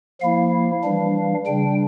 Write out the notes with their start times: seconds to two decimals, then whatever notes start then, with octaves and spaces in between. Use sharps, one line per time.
0.21 F3 A#3 E4 F5
0.83 E3 G3 D4
1.47 C#3 G3 D4 G5